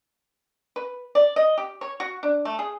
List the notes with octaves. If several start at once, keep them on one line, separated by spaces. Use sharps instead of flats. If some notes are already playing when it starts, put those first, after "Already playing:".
B4
D5
D#5
G4
C#5
F#4
D4
A3
G#4